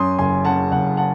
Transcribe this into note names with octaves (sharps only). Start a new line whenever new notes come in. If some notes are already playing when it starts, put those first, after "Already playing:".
Already playing: F#2 C6 D#6
F#1 G#5 C6
C#3 F#5 A5
F#1 F#5
F#5 A5